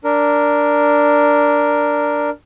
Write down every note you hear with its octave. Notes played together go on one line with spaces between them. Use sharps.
D4 A#4